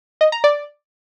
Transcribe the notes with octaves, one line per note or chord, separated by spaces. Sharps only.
D#5
A#5
D5